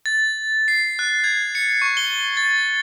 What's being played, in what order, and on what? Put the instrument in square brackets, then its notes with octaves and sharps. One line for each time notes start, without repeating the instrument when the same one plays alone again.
[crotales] A6
C7
F#6
G#6
C#7
C#6
G7
A6